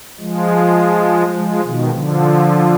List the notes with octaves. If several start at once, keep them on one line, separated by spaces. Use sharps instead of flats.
F3 G#3
F3 G#3
B2 D#3
D3 F3